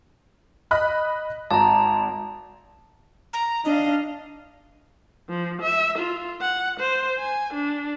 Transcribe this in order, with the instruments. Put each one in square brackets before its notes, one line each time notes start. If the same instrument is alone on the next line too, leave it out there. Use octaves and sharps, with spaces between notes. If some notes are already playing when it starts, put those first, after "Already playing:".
[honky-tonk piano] D#5 B5 F#6
[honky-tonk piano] G#1 [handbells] A5 A#5
[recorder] A#5
[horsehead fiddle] D4 F5 [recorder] D#5
[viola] F3
E5
F4
F#5
C5
G#5
D4